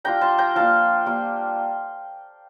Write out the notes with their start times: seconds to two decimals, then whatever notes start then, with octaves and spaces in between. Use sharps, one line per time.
0.04 G3 D4 F4 G5 A#5
0.21 A5 C6
0.38 G5 A#5
0.55 F3 A#3 D4 F4 F5 A5
1.06 G3 A#3 F4